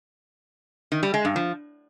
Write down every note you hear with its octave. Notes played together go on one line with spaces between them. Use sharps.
D#3
G3
G#3
G2
F3